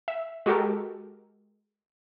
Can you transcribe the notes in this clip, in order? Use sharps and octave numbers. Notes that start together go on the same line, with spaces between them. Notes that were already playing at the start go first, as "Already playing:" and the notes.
E5
G#3 F#4 G4 A4 A#4